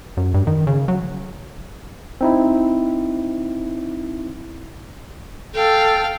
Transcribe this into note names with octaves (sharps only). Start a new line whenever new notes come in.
F#2
G2
D#3
C#3
F#3
C4 D#4 E4
A4 F5 G5